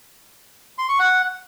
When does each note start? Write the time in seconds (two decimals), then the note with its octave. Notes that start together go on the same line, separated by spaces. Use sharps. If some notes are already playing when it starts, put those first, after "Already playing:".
0.78 C6
0.89 C#6
0.99 F#5